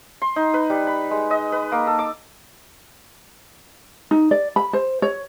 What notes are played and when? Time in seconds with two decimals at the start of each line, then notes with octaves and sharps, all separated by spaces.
0.22 C6
0.36 D#4
0.54 B4
0.70 G3
0.87 B5
1.11 G#3
1.31 D#5
1.52 B4
1.72 A#3
1.87 A4
1.99 D6
4.11 D#4
4.31 D5
4.56 B5
4.73 C5
5.02 C#5